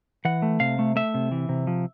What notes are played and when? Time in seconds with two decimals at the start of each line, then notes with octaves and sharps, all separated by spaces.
0.25 E3 F#5
0.42 A3
0.60 C3 F5
0.79 A3
0.96 A3 E5
1.14 C3
1.32 E3
1.49 C3
1.67 F3